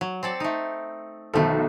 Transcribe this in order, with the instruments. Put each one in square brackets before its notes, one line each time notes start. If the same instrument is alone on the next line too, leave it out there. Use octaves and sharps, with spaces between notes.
[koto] F#3
C4 A4 D5
A3 D#4
[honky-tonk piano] B1 D#3 A4 [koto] F3 A3